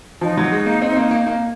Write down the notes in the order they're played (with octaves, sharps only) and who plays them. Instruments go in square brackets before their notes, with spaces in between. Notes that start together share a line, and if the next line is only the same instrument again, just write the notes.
[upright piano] F3 [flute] D#4
[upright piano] F#3
G#3
A#3
C4
A#3
A#3
A#3